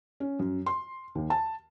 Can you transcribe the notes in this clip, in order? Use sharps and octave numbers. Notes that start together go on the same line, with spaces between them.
C#4
F#2
C6
D#2
A5